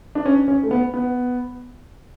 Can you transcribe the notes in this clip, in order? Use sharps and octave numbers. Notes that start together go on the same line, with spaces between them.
D4
C#4
C#4
A3
B3
B3